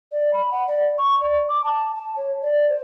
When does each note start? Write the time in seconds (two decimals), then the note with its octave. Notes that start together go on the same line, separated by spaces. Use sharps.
0.12 D5
0.33 B5
0.51 F#5
0.68 D5
0.98 C#6
1.21 D5
1.49 D6
1.64 A5
1.95 A5
2.16 C#5
2.42 D5
2.69 C5